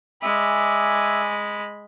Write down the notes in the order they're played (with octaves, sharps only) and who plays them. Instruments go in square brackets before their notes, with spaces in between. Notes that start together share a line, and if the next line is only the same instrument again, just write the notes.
[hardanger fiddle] G#3 B5 [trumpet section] D5 G#5 [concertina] E5